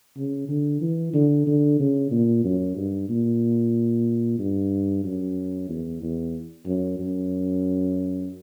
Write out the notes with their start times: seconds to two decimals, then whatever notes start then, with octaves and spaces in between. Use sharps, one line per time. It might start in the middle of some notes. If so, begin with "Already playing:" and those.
0.17 C#3
0.49 D3
0.81 E3
1.14 D3
1.47 D3
1.79 C#3
2.11 A#2
2.44 F#2
2.76 G2
3.09 A#2
4.39 G2
5.04 F#2
5.69 E2
6.02 E2
6.66 F#2
6.99 F#2